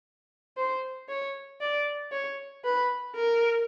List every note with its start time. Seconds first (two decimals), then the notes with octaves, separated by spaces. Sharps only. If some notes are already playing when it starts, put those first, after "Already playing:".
0.57 C5
1.09 C#5
1.61 D5
2.12 C#5
2.65 B4
3.15 A#4